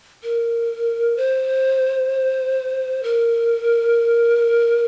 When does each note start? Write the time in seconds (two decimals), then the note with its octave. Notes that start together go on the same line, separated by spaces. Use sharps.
0.23 A#4
1.17 C5
3.03 A#4